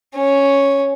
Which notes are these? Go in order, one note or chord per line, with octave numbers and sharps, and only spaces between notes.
C#4